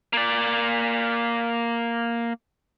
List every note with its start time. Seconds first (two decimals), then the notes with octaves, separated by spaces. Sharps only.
0.13 A#3 D5